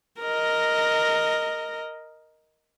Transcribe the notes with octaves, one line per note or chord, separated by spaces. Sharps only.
A#4 D#5